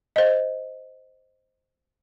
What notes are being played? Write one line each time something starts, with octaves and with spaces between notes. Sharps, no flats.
C5 D#5